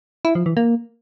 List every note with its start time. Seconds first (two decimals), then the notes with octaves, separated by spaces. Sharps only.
0.25 E4
0.35 F3
0.46 E3
0.57 A#3